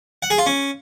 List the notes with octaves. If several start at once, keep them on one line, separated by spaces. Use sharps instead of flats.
F#5
G#4
F4
C#4